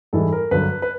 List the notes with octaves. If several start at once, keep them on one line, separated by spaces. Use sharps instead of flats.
G#2 E3 G3 A4
A#4
G2 D3 F#3 B4
B4